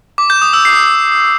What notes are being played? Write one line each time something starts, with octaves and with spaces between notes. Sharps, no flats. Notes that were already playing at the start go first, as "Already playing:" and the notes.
D6
G6
D#6
E6
C7